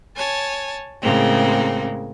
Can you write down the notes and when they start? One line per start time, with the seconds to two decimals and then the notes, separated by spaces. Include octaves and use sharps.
0.17 C#5 G#5 A5
1.02 A2 C#3 G#3 A#3 C4